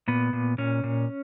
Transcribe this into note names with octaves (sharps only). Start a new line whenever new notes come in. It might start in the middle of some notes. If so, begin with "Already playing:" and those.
A#2 B3
A#2
A#2 C#4
A#2